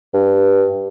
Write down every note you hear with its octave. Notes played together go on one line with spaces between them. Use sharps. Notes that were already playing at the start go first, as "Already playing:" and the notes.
G2